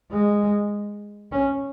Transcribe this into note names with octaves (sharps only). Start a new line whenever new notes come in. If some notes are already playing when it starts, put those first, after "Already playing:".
G#3
C#4